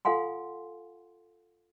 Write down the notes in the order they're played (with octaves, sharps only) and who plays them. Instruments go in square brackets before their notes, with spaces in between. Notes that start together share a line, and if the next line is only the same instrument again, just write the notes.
[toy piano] F4 A4 F5 F#5 G#5 C6